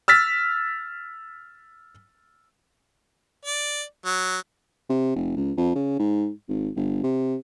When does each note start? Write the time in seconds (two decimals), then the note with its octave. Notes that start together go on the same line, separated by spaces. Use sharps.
0.08 E6 F6 A6 B6
3.45 D5
4.05 F#3
4.89 C3
5.15 F1
5.36 C#2
5.57 F2
5.75 C#3
5.99 G#2
6.48 G#1
6.76 G1
7.03 C3